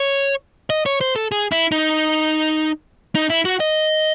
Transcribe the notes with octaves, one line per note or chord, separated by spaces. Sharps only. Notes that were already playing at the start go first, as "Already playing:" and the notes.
Already playing: C#5
D#5
C#5
C5
A4
G#4
E4
D#4
D#4
E4
F#4
D#5